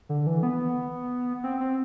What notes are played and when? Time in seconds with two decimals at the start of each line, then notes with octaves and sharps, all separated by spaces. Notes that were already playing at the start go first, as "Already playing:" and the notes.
0.09 D3
0.27 E3
0.43 B3
1.44 C4
1.60 C4